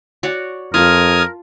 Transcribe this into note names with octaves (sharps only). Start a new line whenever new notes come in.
F#4 C#5 D5
F2 F4 A#4 A5 D#6 F6 G#6